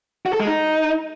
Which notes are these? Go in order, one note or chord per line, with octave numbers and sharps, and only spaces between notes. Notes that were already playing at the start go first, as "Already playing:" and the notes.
F#4
A4
G#3
D#4